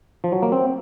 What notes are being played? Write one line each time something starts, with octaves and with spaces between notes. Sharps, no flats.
F3
F#3
A#3
C4